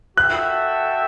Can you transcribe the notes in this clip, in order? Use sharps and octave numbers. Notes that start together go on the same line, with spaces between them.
F#4 A4 E5 G5 F#6